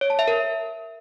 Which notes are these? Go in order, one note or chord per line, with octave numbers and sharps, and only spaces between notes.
C#5
A5
E5
A#4